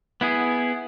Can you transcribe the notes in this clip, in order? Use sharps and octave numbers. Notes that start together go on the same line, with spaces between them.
B3 E4 G#4